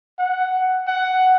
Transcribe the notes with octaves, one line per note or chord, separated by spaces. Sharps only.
F#5
F#5